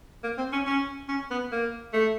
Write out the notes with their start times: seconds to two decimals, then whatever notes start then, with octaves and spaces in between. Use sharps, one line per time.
0.23 A#3
0.38 C4
0.52 C#4
0.67 C#4
1.08 C#4
1.31 B3
1.52 A#3
1.93 A3